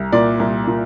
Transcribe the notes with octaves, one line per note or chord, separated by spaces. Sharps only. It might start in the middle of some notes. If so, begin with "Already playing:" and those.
Already playing: C2
A#2 D5
C2
A#2